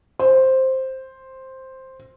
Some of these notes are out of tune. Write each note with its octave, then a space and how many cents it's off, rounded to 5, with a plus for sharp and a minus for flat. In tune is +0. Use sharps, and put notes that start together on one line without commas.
C5 +5